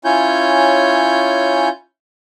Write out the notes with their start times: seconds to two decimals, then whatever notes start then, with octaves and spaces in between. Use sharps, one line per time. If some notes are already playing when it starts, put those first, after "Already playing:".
0.05 C#4 E4 F4 C#5 G#5 G6